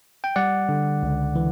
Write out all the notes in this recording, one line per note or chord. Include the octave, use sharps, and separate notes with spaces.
G5
G3 D5 F#5
D3
C#2
E3